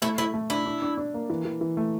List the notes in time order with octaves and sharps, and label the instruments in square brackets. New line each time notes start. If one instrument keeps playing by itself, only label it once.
[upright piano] A3 [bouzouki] E4
[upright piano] A3 [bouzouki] E4
[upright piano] A3
[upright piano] D4 [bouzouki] E4
[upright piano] D4
D4
D4
A#3
E3
E3
E3
A3